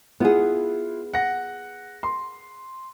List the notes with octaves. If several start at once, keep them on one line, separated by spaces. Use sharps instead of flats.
B3 E4 F4 G#4 F#5
F#5 A#6
C6